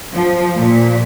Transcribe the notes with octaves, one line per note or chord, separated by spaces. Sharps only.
F3
A#2